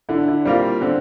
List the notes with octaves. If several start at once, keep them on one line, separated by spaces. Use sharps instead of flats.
D3 E4
D4
E4
G3 A#3 C4 F4
D3 C4